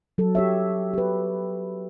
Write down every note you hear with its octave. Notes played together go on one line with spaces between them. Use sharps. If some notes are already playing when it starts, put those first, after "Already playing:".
F#3 A4
G4 C#5 E5
G4 B4